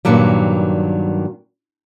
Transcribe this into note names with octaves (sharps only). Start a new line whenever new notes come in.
G2 A#2 D#3 F#3 G3